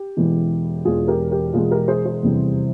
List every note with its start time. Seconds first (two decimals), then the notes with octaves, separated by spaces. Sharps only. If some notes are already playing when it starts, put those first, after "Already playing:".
Already playing: G4
0.17 E1 E2 E3 G#3
0.85 E1 E2 E3 G#3 F4 G#4
1.08 G4 A#4
1.31 G4 A#4
1.54 E1 E2 E3 G#3 F4 G#4
1.71 G4 A#4
1.88 G#4 C5
2.05 G#4 C5
2.22 F1 E2 C3 E3 G3